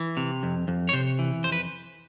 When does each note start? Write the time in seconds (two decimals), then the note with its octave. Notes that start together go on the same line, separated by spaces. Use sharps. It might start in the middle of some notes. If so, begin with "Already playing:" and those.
Already playing: E3
0.17 C3
0.43 F2
0.68 F2
0.89 C#5
0.93 C3 C5
1.19 E3
1.44 F2 C5
1.52 B4